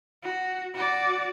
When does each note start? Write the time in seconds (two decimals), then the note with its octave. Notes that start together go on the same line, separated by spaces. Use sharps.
0.23 F#4
0.74 F#4 D5